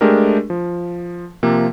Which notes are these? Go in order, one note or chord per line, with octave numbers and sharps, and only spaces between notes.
G#3 A3 D4 G4 G#4 A#4
F3
C3 F3 A#3